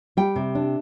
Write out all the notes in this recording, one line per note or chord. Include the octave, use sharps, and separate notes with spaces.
G3 G5
C3
D4